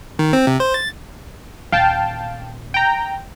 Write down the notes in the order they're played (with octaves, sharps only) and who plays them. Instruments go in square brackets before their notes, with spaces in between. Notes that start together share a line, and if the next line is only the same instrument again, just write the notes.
[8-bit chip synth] D#3
C4
C3
C5
A6
[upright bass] D#1 [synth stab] F5 G5 A5
[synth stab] G5 A#5